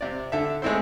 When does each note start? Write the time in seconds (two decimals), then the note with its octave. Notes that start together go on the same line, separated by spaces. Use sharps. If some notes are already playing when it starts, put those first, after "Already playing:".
0.01 C3 D5
0.32 D3 A4 E5
0.62 G#3 A3 C4 E4 C5